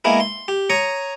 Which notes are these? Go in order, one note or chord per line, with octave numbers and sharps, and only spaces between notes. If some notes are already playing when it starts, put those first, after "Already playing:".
G#3 A#3 B3 E4
C6
G4
C#5 A#5 C#6 D#6